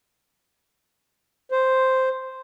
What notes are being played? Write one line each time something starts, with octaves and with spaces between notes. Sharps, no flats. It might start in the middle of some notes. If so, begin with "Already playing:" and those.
C5